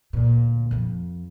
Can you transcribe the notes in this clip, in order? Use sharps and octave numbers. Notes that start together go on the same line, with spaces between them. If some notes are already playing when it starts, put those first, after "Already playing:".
D2 A#2
F2 F3